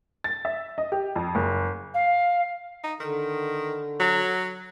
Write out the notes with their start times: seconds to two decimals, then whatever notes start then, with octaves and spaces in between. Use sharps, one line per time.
0.24 A6
0.45 E5
0.78 D#5
0.92 G4
1.16 F2
1.35 F#1
1.93 F5
2.84 D#4
3.00 D3 D#3
4.00 F#3